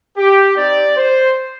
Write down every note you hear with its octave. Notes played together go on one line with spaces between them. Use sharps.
G4
C4 D#4 G4 D5
C5